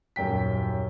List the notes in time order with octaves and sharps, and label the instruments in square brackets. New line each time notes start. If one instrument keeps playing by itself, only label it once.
[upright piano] D#1 F#2 G5 B6